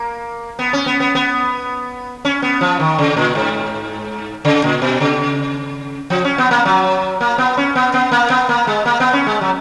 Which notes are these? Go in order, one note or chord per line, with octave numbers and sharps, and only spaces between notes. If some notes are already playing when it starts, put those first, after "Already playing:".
Already playing: A#3
B3
C#4
B3
B3
B3
C#4
B3
F3
D#3
C#3
A#2
G#2
C#3
A#2
B2
C#3
F3
C#4
B3
A#3
F#3
A#3
B3
C#4
B3
B3
A#3
B3
A#3
G#3
A#3
B3
C#4
G#3
F#3